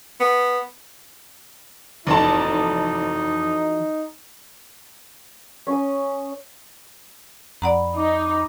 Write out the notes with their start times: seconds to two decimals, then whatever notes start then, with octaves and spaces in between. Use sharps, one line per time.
0.20 B3
2.07 F1 E3 D#4 F#4 A4 A5
5.67 C#4 D#6
7.62 F2 D5 F#5 A#5 B5
7.94 D#4 B5 D6